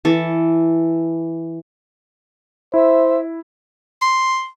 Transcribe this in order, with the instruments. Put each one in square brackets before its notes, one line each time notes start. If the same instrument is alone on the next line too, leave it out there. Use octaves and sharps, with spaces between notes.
[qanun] E3 A4
[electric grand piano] E4 [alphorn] C5 [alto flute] E5
[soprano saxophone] C6